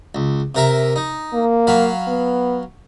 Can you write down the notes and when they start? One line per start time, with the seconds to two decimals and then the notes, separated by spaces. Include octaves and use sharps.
0.15 C#2
0.55 C3 A#4 E5
0.96 D#4
1.34 A#3
1.67 F#3 F5 B5
2.08 B3